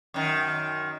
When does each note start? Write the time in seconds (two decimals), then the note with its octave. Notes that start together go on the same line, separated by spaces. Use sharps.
0.14 F#2 D#3